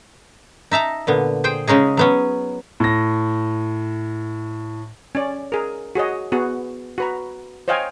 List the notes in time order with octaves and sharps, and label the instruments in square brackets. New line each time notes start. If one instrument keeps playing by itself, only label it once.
[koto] D#4 E5 A5 A#5
A#2 D3 B3
G#4 C5 G5
C#3 G#3 C#4 D#4 G#4
F#3 B3 C#4
[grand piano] A2 A#6
[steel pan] C#4 D5
G#4 A#4
F#4 G#4 C#5 D#5
B3 F#4 G#4
F#4 B4 A#5
C5 C#5 D#5 F5 G5 G#5